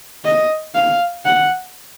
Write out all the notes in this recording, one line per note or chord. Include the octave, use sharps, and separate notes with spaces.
D#5
F5
F#5